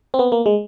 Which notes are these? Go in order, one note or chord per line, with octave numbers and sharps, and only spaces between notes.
C4
B3
A#3
G#3